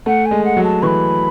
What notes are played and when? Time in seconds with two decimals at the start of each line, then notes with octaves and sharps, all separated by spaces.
0.06 A3 F#5
0.25 G#5
0.31 G#3
0.44 F#5
0.57 F#3
0.63 A5
0.83 E3 B5 C#6